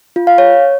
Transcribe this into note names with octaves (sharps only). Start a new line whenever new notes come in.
F4
F5
C#5